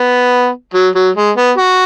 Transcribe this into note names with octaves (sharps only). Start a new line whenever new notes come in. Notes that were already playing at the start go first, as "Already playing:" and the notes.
Already playing: B3
F#3
F#3
G#3
B3
F#4